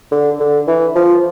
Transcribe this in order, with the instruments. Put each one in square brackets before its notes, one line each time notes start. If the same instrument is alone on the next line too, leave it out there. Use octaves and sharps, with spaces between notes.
[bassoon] D3
D3
E3
F3